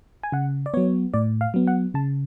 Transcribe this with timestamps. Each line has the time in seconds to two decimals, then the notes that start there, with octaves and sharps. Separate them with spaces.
0.23 G#5
0.32 C#3 F#5
0.66 D5
0.74 F#3 B3 C#5
1.14 A2 D5
1.41 F5
1.54 F#3 B3
1.67 F#5
1.94 C#3 A5